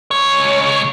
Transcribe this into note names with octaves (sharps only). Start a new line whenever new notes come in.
C#2 C#5